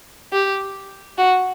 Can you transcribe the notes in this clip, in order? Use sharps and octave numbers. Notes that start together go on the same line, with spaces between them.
G4
F#4